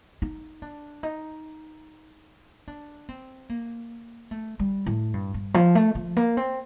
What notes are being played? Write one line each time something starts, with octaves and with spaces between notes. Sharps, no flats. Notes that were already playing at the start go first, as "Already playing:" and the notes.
D#4
D4
D#4
D4
C4
A#3
A3
G3
A2
G2
G2
F3
A3
F3
A#3
C4